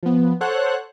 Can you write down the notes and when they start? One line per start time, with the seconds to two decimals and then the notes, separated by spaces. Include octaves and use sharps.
0.03 F3 B3
0.41 A4 C5 C#5 F#5 F#6